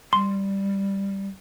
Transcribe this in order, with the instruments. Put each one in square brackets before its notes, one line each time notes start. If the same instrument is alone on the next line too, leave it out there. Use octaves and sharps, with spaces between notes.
[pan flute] G3 [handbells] C6